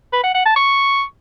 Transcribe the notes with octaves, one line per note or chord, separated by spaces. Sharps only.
B4
F#5
F#5
A5
C#6